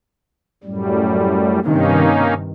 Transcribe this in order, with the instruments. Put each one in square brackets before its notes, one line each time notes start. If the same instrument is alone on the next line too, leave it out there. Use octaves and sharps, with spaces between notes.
[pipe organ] F#2 A2 G3
[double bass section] G2 C3 D#3 [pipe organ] A#3 C#4 D#4